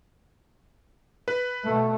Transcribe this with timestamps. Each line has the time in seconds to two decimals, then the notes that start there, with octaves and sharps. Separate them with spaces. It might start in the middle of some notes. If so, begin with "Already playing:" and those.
1.28 B4
1.64 B2 A3